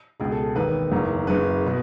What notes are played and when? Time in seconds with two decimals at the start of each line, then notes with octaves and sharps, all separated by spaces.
0.20 C#2 B2 G#4
0.32 A4
0.43 A4
0.56 E1 D#2 D#3 B4
0.92 F#1 E2 D#3
1.27 F#1 F#2 C#3 B4
1.66 B2